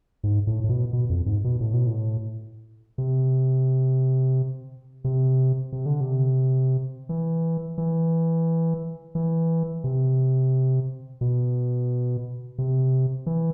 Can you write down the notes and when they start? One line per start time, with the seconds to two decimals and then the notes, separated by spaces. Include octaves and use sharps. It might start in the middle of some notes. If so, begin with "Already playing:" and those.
0.23 G#2
0.47 A2
0.64 A2
0.69 B2
0.93 B2
1.10 F2
1.26 G#2
1.44 B2
1.60 A2
1.74 B2
1.87 A2
2.98 C3
5.04 C3
5.72 C3
5.86 D3
6.01 C3
7.09 E3
7.78 E3
9.15 E3
9.84 C3
11.21 B2
12.58 C3
13.26 E3